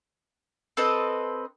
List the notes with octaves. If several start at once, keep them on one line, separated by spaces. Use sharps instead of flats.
C4 A4 B4 D#5